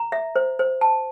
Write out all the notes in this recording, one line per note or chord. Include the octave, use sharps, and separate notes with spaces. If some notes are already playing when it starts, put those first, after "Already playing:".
Already playing: A#5
E5
C5
C5
A5